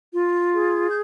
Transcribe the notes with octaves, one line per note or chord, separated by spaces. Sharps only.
F4
G#4
G6